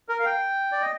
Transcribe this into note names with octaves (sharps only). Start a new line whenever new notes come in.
A#4
F5
G5
D5
D#5